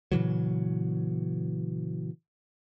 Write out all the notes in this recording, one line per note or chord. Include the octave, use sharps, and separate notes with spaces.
A#2 C#3 E3 F#3